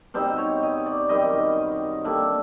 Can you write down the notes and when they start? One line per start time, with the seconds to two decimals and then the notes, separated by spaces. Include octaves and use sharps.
0.14 B2 G3 C4 D#4 C5
0.38 C#5
0.62 D#5
0.86 D5
1.09 F#2 D#3 G3 D#5
2.04 D3 G3 A#3 E5